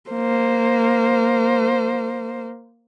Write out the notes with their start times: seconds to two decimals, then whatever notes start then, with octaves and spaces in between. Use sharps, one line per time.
0.10 A#3 C5